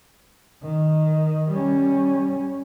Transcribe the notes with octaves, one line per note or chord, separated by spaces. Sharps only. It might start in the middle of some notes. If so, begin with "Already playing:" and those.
D#3
G3 C#4